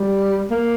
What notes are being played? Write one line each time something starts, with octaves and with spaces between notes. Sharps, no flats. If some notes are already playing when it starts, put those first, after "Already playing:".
Already playing: G3
A#3